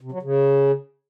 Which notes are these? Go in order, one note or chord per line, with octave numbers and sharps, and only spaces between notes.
C3
F#3
C#3